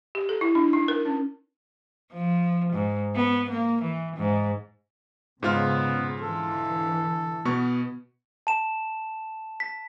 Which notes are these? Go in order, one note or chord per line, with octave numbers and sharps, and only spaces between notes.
G4
A4
E4
D4
D#4
A#4
C#4
F3
G#2
B3
A#3
E3
G#2
G#2 C#3 B3 F4 F6
D3 E3 A4
B2 B3 C#6
A5 E7
B6